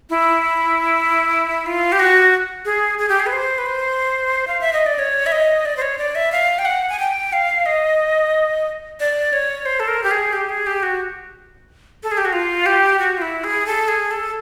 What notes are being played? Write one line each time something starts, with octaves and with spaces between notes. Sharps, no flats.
E4
F4
G4
F#4
G#4
G#4
G4
G#4
B4
C5
B4
C5
F5
E5
D#5
D5
C#5
E5
D#5
D5
C5
C#5
D5
E5
F5
G5
F#5
G#5
G5
F5
D#5
D5
C#5
C5
A4
A#4
G4
G#4
G4
G#4
G4
F#4
A4
G#4
G4
F#4
F4
G4
F#4
F4
E4
G#4
A4
G#4
A4